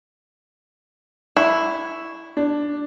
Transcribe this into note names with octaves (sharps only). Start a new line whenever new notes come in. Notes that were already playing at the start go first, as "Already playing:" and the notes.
E4 C#6
D4